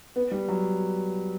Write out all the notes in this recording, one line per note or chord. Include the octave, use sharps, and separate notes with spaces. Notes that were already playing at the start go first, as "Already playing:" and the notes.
B3
G3
F#3